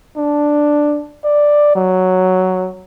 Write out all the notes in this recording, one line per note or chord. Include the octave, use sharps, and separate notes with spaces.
D4
D5
F#3